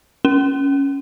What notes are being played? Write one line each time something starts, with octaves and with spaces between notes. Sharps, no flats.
C#4